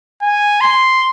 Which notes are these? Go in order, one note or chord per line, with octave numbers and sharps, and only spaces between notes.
G#5
C6